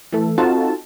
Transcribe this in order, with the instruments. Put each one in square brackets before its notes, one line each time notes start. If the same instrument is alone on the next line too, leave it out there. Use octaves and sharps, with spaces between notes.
[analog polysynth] E3 A3 A4
C4 D#4 F4 F#4 A4 A5